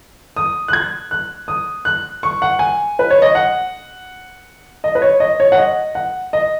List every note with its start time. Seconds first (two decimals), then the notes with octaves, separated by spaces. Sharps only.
0.36 D#6
0.68 F#6
0.73 G#6
1.11 F#6
1.48 D#6
1.85 F#6
2.23 C#6
2.42 F#5
2.59 G#5
2.99 B4
3.10 C#5
3.22 D#5
3.35 F#5
4.84 D#5
4.95 B4
5.02 C#5
5.20 D#5
5.40 C#5
5.52 F#5
5.58 D#5
5.95 F#5
6.33 D#5